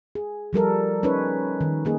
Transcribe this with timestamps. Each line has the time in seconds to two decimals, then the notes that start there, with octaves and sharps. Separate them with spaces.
0.15 G#4
0.53 F3 G3 A4 A#4
1.03 C#4 D#4 B4 C#5
1.61 D#3
1.85 A#3 D#4 G#4